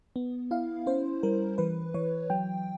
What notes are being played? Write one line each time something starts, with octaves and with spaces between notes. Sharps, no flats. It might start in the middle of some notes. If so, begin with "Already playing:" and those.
B3
E4 F5
C#4 C5
G3 A#4
E3 B4
E3 C#5
F#3 G5